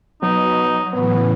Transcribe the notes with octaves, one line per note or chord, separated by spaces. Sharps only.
B2 F#3 D#4
A2 C#3 E3 B3